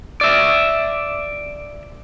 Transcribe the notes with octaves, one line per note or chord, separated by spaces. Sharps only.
D5 E5